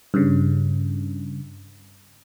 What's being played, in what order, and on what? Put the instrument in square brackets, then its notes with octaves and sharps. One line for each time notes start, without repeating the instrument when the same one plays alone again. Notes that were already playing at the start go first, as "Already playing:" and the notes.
[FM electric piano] G2 C#3